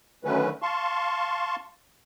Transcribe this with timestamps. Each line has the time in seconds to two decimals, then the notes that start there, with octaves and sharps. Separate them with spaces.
0.24 D3 D#3 F#3 A3 C#4 B4
0.62 F5 A5 C6 C#6